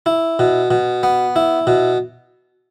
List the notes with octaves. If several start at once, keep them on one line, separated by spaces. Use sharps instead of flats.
E4
B2
B2
B3
E4
B2